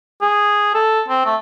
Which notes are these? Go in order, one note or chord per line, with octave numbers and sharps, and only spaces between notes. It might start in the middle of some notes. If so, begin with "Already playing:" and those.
G#4
A4
C4
A3